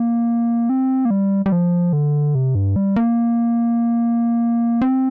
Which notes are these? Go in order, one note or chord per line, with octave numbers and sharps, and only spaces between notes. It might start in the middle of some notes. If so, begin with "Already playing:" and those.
Already playing: A#3
C4
A#3
G3
G3
F3
D3
C3
G2
G3
A#3
C4